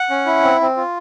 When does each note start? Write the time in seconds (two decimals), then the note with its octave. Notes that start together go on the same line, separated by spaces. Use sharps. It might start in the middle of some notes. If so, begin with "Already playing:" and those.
Already playing: F#5
0.10 C#4
0.26 E4
0.43 C4
0.61 C4
0.77 F4